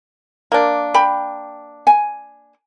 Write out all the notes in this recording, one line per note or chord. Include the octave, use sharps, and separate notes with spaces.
A#3 D4
G5 B5
G#5